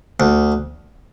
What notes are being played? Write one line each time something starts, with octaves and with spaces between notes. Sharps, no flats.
D2